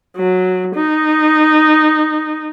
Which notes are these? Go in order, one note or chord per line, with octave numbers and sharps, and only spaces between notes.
F#3
D#4